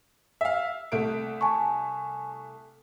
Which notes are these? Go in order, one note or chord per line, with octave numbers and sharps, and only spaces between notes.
E5 F5
C2 A3 D7
G#5 A5 C#6